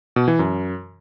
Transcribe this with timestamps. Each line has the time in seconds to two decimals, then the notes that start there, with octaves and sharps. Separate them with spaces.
0.16 B2
0.28 E3
0.39 F#2